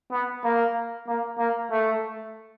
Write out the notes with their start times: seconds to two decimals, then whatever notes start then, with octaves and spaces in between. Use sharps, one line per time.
0.12 B3
0.44 A#3
1.07 A#3
1.39 A#3
1.72 A3